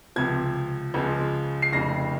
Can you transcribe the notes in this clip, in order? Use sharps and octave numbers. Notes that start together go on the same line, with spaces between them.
C#2 C3 F3 G#6
C#2 C#3 F3 G#3
C7
F1 F2 C#3 G3 A#6